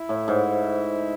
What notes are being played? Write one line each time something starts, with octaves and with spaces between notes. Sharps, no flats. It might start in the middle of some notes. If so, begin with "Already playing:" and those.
Already playing: E4
A2
G#2